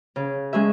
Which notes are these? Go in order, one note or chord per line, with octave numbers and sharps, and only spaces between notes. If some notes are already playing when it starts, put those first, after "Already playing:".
C#3
G#3 C#4 G#4 E5